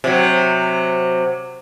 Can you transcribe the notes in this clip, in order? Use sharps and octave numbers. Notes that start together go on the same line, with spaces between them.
C3 F#3